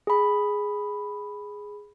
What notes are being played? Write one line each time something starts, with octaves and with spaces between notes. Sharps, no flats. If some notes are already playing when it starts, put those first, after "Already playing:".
G#4 B5